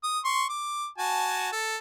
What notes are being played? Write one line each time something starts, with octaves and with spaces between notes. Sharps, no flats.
D#6
C6 C#6
D6
F#4 G#5 A5
A4